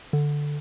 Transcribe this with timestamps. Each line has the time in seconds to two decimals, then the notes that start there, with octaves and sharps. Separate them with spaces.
0.13 D3